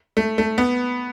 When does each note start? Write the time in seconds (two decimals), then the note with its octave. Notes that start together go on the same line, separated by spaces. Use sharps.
0.17 A3
0.38 A3
0.58 B3